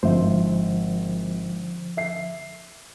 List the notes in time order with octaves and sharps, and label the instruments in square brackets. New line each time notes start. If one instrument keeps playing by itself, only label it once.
[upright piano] G#1 E5 [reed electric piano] D3 F3 C5
[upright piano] E5 C7